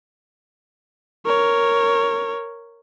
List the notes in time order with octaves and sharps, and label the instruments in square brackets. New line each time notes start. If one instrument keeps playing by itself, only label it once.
[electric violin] A#4 C#5